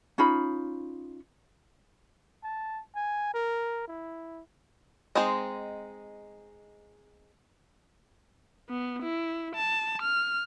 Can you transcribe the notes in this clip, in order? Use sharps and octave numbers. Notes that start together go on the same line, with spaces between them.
C#4 D#4 F4 B5
A5
G#5
A#4
E4
G#3 C4 D#4 C5 D#5
B3
E4
A5
F6